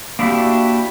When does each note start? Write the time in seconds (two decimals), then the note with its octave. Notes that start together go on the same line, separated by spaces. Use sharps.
0.19 A#3 D4 E4 F#4 G4